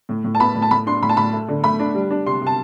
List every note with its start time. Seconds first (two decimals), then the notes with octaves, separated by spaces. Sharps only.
0.09 A2
0.24 A2
0.35 A5
0.39 B3 B5
0.55 A2
0.62 A5
0.71 A2 B5
0.87 D4 C6
1.02 A2 B5
1.09 A5
1.17 A2 B5
1.33 A3
1.48 D3
1.63 A3 B5
1.80 D4
1.95 G3
2.11 D4
2.26 C3 C6
2.42 C3 A5